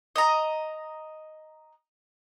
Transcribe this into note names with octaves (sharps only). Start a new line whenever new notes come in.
D#5 A#5